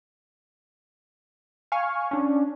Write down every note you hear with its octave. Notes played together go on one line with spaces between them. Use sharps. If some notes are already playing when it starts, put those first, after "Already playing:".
F5 G#5 C#6
C#4 D4